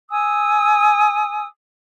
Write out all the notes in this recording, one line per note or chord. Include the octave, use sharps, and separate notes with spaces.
G#5 D#6 E6